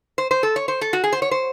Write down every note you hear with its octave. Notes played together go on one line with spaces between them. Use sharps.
C5
C5
A4
C#5
C5
A4
F#4
G#4
C5
C#5
C5